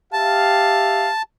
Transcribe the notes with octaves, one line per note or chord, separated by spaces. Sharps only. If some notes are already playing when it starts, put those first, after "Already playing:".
G4 E5 F5 A5